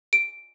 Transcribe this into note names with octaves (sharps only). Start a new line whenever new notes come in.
D7